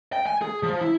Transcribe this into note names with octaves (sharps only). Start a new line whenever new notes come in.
G5
G#5
G#4
F3
E4